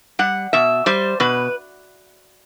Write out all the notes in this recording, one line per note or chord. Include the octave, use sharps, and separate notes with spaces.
G3 F#5
B2 E5
G3 C5
B2 B4